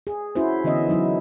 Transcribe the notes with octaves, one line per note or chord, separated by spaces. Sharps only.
G#4
C#4 E4 F#4 C5
D3 E3 B3 C#4 D#5 E5
E3 F#3 D#4 E4